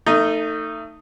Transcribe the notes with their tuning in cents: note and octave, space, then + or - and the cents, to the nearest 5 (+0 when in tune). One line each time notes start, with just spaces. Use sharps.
A3 +30 D#4 +0